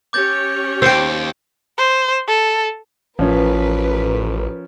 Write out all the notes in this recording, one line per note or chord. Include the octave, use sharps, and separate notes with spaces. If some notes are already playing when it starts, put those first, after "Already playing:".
C#4 G4 C#5 D6 G6 A6
D#2 C5 G5 E6 C#7 D7
C5
A4
A1 F3 C#4 A#4 B4